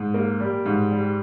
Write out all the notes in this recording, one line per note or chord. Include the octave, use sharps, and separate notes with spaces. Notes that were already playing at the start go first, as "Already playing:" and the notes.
Already playing: G#2
A#3
G3
G#2
G3